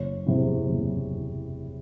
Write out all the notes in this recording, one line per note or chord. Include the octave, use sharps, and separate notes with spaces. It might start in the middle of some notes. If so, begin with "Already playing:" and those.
Already playing: F#1 C#5
E2 C3 E3
F#1